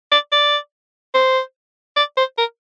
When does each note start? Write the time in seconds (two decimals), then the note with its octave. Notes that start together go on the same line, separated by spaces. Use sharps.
0.12 D5
0.32 D5
1.15 C5
1.97 D5
2.17 C5
2.38 A#4